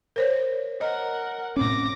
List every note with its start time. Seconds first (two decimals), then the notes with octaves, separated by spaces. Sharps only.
0.16 A#4 C5 C#5
0.81 A#4 D#5 F#5
1.57 A2 C4 C#4 D6 A#6